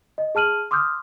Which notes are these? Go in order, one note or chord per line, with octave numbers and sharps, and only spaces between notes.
D#5
G#4 A5 F6 D#7 F#7
C6 D6 D#6 F6 G6